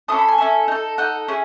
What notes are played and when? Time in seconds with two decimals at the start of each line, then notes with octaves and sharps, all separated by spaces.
0.08 C#4 E4 A4 D#6
0.18 B5
0.28 G#5
0.38 C#4 E4 A4
0.68 D#4 A4
0.98 D#4 A4 F#5
1.28 C#4 E4 G#4